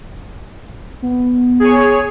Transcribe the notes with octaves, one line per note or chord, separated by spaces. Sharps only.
B3
G#4 C#5